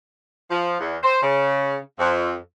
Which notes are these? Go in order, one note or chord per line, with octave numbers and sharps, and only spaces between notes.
F3
E2
C5
C#3
F2